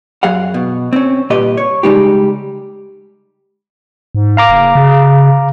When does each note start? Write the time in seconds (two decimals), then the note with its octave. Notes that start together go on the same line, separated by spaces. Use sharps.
0.23 F#2 F#3 G#4 F5 F#5
0.54 B2
0.93 C4 C#4
1.30 C2 A#2 G4 B4 D#5
1.57 C#5
1.83 C#3 G3 G#3 D#4 G4
4.15 G#2
4.37 F5 A#5 D6
4.49 F#1
4.75 C#3